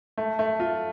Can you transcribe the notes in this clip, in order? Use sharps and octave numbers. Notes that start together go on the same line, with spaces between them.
A3
A3
F4